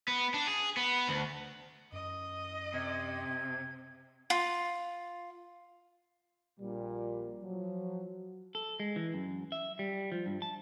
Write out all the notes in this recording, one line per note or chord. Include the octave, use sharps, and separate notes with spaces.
B3
D4
G#4
B3
D2
F#2 D#5
C3 G#6
F4
A#1 A#2 G3
F3 F#3
A4
G#3
E3
F#2
E5
G3
F3
G2
A5